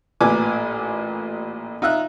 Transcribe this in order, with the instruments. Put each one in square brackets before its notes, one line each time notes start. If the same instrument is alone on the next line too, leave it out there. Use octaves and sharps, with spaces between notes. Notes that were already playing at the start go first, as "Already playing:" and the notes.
[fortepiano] A1 A#2 B4 G#5 D6
D#4 F4 E5 F#6